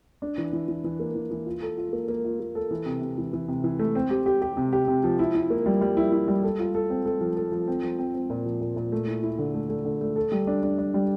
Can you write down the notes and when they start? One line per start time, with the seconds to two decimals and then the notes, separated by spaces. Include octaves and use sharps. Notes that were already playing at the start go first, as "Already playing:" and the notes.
0.22 D4
0.38 E3
0.53 E3
0.68 E3
0.84 E3
1.00 A#3
1.15 E3
1.31 E3
1.46 F4
1.62 A4
1.77 F4
1.93 A#3
2.08 A#3
2.24 F4
2.40 A#3
2.55 A4
2.71 E3
2.86 C3
3.02 C3
3.18 E3
3.33 E3
3.48 C3
3.64 E3
3.79 A3
3.95 C4
4.10 G4
4.26 G4
4.42 G4
4.57 C3
4.73 G4
4.88 C3
5.04 F3
5.19 E4
5.35 E4
5.50 A#3
5.66 G3
5.81 G3
5.97 E4
6.12 E4
6.28 G3
6.43 A4
6.59 F4
6.75 A4
6.90 C4
7.06 A4
7.21 F3
7.37 A4
7.52 F3
7.68 C4
7.83 F3
7.99 C4
8.14 C4
8.30 A#2
8.46 F3
8.61 A#2
8.76 A#2
8.92 A3
9.07 E4
9.23 E4
9.39 D3
9.54 A3
9.70 A3
9.85 D3
10.01 A3
10.16 A4
10.32 G3
10.47 D4
10.63 D4
10.78 D4
10.94 G3